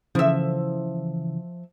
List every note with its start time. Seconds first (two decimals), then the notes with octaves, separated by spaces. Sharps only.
0.15 C#3 E3 F3 E5